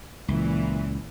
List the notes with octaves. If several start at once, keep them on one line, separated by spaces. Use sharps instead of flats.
C#2 A#2 E3